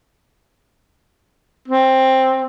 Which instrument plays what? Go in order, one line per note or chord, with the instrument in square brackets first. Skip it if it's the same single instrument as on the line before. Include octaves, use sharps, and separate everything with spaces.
[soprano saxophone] C4